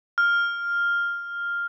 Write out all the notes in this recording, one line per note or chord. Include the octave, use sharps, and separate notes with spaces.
F6